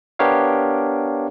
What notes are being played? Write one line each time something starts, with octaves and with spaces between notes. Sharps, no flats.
B3 D4 G4 A#4 C#5 F5